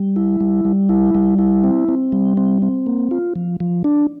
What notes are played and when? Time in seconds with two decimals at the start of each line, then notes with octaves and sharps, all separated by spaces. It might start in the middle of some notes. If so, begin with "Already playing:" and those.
Already playing: G3
0.16 E4
0.40 G3
0.65 G3
0.89 E4
1.15 G3
1.39 E4
1.64 C4
1.88 C4
2.12 G3
2.37 C4
2.62 C4
2.86 A#3
3.11 F4
3.36 F3
3.60 F3
3.84 D4